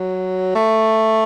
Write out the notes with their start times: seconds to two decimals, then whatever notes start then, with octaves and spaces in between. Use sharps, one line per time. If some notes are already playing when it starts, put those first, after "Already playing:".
Already playing: F#3
0.55 A3